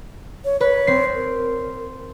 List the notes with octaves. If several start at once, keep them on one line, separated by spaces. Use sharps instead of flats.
C#5
B4 C#5
C4 C7
A#4